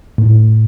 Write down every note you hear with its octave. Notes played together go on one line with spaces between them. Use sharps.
A2